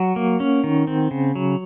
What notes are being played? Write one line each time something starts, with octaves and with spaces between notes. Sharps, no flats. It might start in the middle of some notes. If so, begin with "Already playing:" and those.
Already playing: F#3 F#5
A#3
C#4
D#3
C4
C#3
F#3